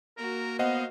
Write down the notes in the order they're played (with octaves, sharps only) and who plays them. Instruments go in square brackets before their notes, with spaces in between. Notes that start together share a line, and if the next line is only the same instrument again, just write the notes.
[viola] A#3 F#4 [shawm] A#4
[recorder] B3 [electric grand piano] C5 D#5 F#5 [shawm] F5